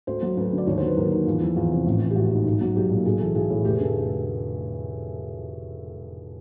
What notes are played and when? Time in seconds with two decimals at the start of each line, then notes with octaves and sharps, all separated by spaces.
0.07 D2 C5
0.22 F#3
0.37 D2 B4
0.53 D3
0.58 D5
0.67 D#2 C#5
0.77 C5
0.82 F#3 B4
0.97 D#2 A#4
1.11 D#3 F#4
1.26 E2 F4
1.41 F3 E4
1.56 E2 F4
1.71 C3
1.86 A1
2.02 E3
2.11 G4
2.16 A1 F#4
2.31 G#2
2.46 B1
2.61 F#3
2.76 B1 G4
2.90 A#2
3.05 B1 G#4
3.20 E3 A4
3.35 B1 G#4
3.50 A2
3.65 F1 G4
3.75 G#4
3.80 D3 A4